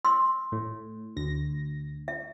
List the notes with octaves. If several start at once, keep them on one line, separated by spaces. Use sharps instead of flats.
C6 E6
A2
D2 A#6
E5